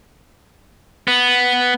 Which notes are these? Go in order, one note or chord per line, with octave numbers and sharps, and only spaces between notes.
B3